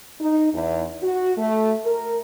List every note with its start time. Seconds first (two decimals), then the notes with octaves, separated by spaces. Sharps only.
0.20 D#4
0.54 E2
1.03 F#4
1.37 A3
1.85 A#4